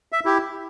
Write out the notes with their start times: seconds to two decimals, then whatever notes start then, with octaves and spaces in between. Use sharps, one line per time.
0.12 E5
0.25 E4 G4